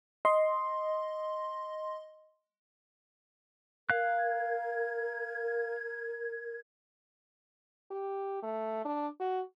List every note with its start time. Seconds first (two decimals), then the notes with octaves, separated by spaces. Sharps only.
0.25 D#5 C6
3.90 A#4 F5 F#6 G#6
7.91 G4
8.42 A3
8.85 D4
9.20 F#4